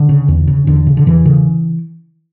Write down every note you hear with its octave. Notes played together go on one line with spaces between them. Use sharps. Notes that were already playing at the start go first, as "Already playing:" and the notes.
Already playing: D3
C#3
E2
C#3
E2 D3
C#3
D3
E2 E3
C#3